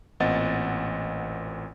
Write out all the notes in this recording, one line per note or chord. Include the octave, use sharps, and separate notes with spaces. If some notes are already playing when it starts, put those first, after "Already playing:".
A1 A#2 C4 D#5 F#5 A6